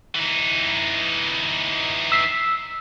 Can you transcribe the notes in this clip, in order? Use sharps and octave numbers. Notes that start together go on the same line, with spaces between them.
E3 D#4
E6 B6 C7